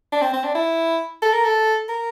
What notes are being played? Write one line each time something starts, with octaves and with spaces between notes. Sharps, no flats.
D4
C4
C4
D4
E4
A4
A#4
A4
A#4